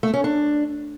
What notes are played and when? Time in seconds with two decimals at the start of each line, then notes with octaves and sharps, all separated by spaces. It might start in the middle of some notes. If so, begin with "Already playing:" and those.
0.03 A3
0.14 C#4
0.24 D4